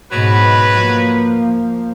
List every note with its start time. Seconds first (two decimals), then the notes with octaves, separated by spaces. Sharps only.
0.13 G#2 B2 F#3 B4
0.77 F3 A#3